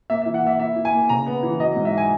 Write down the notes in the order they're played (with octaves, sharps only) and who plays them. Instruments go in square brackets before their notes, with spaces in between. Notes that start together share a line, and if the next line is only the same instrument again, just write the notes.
[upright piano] A#3 E5
E5
E3
F#5
A#3 E5
E4 E5
E4
G#5
A#3
C#3 A#5
B3
E3
F#3 D#5
G#2
E5
G#5